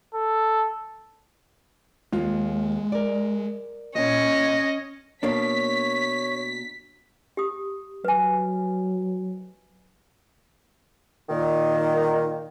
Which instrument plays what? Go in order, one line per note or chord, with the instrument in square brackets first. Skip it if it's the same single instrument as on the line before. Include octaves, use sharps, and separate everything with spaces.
[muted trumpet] A4
[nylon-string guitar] D#2 F4 [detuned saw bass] G#3
[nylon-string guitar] A#4 D5
[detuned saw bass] A#2 [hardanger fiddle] C#4 [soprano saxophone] D#5
[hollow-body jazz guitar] B2 A#3 D4 [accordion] C#5 [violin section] B6
[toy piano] G4 D#6
[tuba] F#3 [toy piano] B4 G#5
[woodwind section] A#2 D#3